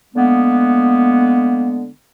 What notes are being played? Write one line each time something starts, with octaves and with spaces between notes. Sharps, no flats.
D3 G#3 A#3 B3